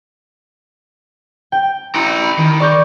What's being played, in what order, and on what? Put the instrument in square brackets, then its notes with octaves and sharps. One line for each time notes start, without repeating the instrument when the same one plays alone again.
[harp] G5
[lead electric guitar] E4 A#5
[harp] B5 D7
[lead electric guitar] D#3
[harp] D5 C#6 G6